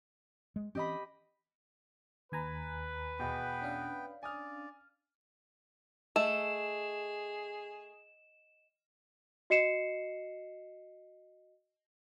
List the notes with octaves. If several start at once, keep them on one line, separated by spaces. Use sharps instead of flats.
G#3
E3 C4 C#4 G4 D#5 B5
D#2 B4 G#5 A#5
E2 B2 B3 G5
C#4 D4 F5
D5 G#5 D#6 F6
A3 G#4 D#5 E7
F#4 D#5 C7 C#7 E7